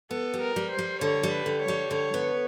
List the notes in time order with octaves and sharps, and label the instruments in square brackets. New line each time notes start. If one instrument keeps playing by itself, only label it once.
[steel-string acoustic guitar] B3 [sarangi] A4
[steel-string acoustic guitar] G3
[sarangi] A#4
[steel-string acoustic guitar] G3
[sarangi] C5
[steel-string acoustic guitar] G3
[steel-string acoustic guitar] D3 [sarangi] C#5
[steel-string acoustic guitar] G3
[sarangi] B4
[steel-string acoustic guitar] D3
[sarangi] C#5
[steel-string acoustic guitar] G3
[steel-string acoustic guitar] D3 [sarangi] C#5
[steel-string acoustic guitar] B3